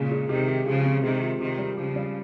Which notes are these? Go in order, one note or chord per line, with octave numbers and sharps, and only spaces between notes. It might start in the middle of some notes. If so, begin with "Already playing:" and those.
Already playing: A#2 C#3 G#3
G#3
C3 D#3 G4
G4
C#3 F3 G#3
C4
C3 D#3 G#3
F4
C3 D#3 G4
G3
C#3 F3 G4
G3